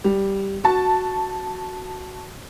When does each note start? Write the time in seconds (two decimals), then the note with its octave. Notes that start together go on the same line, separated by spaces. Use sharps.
0.04 G3
0.64 F#4 A5